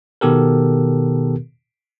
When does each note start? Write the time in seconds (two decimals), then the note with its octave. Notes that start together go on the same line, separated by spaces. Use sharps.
0.21 B2 D#3 B3 G4 A4 A#4